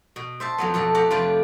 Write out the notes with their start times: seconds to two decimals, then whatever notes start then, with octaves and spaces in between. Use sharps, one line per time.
0.16 B2
0.40 C5 E5 A5
0.58 F2 F#3 B3
0.74 F2 B2 A4 F#5
0.95 A3 G4 F#5 A#5
1.11 F2 C3 F4 B4 D5